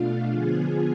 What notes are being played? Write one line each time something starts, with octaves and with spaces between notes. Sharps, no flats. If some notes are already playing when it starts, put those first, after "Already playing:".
Already playing: B2 A3 D4 F4 F5
D3 F3 B3 F4 G#4 G#5